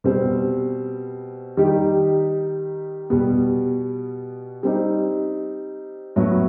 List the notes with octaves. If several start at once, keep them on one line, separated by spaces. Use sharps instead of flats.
B2 G3 C4
D#3 G3 D#4 G4
B2 G3 B3
G3 C4 D#4
A2 F#3 B3